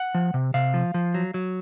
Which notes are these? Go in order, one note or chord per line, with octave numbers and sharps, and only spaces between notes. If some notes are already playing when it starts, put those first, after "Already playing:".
Already playing: F#5
F3
C3
C3 F5
F3
F3
F#3
F#3